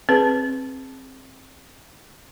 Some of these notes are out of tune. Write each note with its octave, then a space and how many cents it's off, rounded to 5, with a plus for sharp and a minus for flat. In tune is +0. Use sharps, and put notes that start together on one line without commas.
C4 +15 G#4 +0 B4 +0